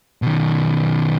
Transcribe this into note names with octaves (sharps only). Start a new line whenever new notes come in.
B2 D#3